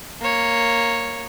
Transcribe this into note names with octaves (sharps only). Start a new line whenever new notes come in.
A#3 C#5